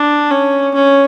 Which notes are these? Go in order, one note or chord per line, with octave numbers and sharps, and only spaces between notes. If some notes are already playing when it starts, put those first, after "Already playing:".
Already playing: D4
C#4
C#4